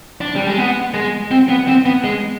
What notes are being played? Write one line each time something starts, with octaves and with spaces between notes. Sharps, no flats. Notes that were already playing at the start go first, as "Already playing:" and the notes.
D4
G3
G#3
B3
G#3
C4
B3
C4
B3
G#3